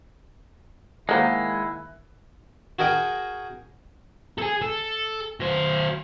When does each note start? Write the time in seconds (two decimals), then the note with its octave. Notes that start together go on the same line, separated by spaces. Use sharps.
1.09 D#3 F3 G#3 A#3 E4 C5 F#5 F#6
2.79 F#4 G#4 A#4 D#5 G5
4.38 G#4 A4
4.62 A4
5.40 F#3 C5